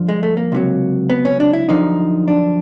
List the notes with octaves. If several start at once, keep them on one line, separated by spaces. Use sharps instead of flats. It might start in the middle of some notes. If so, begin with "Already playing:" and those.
Already playing: G2 D3 F3
G#3
A3
A#3
C#2 C3 D#3 F#3
B3
C#4
D4
E4
F#2 D3 F3 D#4
D4